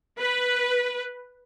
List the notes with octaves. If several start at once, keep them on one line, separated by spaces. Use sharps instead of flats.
B4